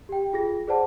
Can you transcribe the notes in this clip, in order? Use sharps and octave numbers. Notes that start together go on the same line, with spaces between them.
G4 G5
F4 G#4 A#6
G#4 B4 C5 D5 F#5 A5